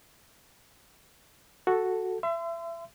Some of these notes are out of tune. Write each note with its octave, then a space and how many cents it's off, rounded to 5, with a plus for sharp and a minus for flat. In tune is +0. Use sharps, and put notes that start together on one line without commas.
F#4 +0 A4 +0
E5 +30 C6 -35